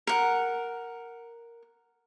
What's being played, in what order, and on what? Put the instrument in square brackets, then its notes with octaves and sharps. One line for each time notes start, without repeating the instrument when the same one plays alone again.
[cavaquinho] A#4 F#5